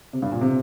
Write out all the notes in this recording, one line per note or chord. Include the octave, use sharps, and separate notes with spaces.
C3
G2
A#2
C3